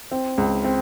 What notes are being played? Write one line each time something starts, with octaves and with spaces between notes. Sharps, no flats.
C4
C#2
C4